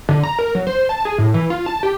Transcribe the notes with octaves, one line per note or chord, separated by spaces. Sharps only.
D3
A#5
A#4
F#3
C5
A5
G#4
A2
E3
F4
A5
G4